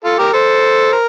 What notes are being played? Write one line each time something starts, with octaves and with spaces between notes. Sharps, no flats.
F4 A4
G4 A#4
A4 C5
A#4